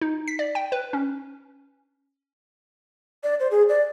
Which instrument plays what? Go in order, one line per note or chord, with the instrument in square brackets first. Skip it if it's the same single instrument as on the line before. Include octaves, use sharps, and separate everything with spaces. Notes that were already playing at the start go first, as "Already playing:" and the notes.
[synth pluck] D#4
B6
D5
G5
B4
C#4
[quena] D5
C5
G#4
D5